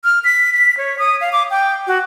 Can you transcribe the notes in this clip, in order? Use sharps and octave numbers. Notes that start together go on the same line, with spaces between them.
F6
B6
B6
C#5
D#6
F5
D6
G5
F#4